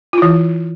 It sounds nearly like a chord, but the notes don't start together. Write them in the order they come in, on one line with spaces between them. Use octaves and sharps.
F4 E4 E3